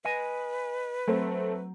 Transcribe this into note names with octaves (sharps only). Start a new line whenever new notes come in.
B4 D#5 G#5
F#3 A3 C4